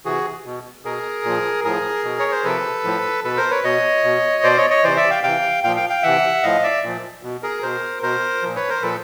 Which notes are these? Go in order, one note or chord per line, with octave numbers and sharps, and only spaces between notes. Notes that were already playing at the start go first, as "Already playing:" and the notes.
C3 E3 F#4 G#4
B2
B2 G#4 A#4
A#2 F3
A2 F3 G#4 A#4
B2
C#5
C5
C3 F3 A4 B4
A2 F3
B2 A4 B4
A#4 C5
B4 C#5
B2 C#5 D#5
B2
B2 C5 D5
C#5 D#5
C#5 D#5
C3 E3 C5 D5
D5 E5
F5 G5
C3 E3 F5 G5
A#2 F3 F5 G5
F5 G5
F5 G5
C3 E3 E5 F#5
A2 F3 D#5 F5
D5 E5
A#2 F3
B2
G#4 A#4
B2 A#4 C5
B2 A#4 C5
A#2 F3
B4 C#5
A#4 C5
A#2 F3 A4 B4